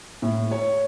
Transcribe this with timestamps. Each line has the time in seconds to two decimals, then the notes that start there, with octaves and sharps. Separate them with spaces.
0.22 A2
0.51 C#5